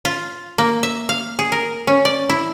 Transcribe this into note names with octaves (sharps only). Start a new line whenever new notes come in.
F4
A#3
E5
F5
G#4
A#4
C#4
D5
E4